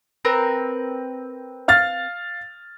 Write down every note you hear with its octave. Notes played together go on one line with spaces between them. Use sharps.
C4 A#4 B4
F5 F6 A6